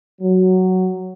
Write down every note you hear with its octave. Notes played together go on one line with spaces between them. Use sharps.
F#3